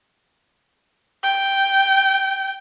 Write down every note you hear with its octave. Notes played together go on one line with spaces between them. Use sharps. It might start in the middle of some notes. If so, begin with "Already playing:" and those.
G5